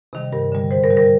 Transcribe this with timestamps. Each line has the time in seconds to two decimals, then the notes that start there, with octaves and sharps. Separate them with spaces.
0.13 C3 D#3 G3
0.32 G2 A#4
0.52 D3 G3
0.71 G#2 C5
0.84 A#4
0.90 D#3 G3
0.97 A#4